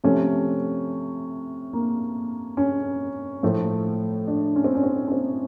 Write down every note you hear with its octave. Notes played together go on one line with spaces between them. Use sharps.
C3 F3 A3 C#4
A#3
C#4
A2 F3 A3
D4
C#4
C4
C#4
C4
C#4
C4